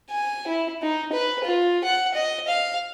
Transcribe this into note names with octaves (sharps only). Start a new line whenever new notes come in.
G#5
E4
D#4
B4
F4
F#5
D#5
F5